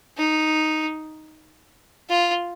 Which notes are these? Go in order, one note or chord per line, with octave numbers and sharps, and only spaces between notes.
D#4
F4